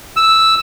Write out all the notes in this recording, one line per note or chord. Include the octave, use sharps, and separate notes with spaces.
E6